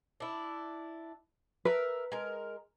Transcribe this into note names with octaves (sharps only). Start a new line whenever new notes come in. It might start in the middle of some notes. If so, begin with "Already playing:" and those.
D4 E4
A#4 B4 E5
G#3 A#4